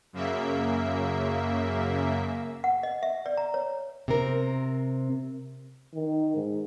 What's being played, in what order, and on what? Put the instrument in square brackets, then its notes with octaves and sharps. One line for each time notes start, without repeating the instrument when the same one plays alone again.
[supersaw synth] F#2 C#3 A#3 E5
[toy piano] F#5
D#5
E5
D5
A#5
C#5
[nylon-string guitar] C3 C4 A#4
[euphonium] D#3
G#2